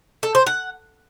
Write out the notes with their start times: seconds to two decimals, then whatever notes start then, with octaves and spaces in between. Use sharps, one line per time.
0.23 A4
0.35 C5
0.47 F#5